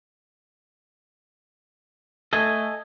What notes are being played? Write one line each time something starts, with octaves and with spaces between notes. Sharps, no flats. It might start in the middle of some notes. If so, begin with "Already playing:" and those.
A3 A4 D#5 G#5